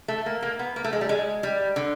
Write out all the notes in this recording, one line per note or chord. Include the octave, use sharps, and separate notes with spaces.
A3
A#3
A#3
B3
A#3
A3
G#3
G3
G#3
G3
D3